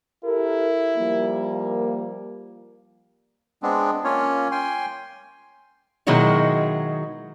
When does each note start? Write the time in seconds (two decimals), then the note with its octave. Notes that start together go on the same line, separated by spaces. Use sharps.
0.25 E4 G4 A4 A#4
0.98 F3 G3 A#3
3.63 G#3 B3 C4 D4
4.04 A#3 C#4 F4 C#5
4.51 G5 G#5 C6
6.07 B2 D#3 F#3 G#3 E4 F#4